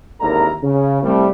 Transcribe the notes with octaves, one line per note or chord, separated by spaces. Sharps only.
G#1 D#2 D3 E4 A#4 A#5
C#3
C2 G3 A3